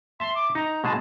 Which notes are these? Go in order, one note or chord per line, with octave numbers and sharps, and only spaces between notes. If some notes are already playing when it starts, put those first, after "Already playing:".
E5 A5 C6
D6
D#4 A#5
B2 G#3 G#4 A5